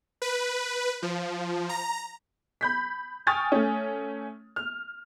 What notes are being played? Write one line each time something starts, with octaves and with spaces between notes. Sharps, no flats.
B4
F3
A#5
B5 G6 B6
G5 G#5 C#6 D#6 F6 A6
A3 C#4
F6